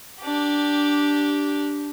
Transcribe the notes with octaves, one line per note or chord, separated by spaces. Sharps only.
D4 G4